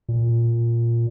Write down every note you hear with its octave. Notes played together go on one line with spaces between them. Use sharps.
A#2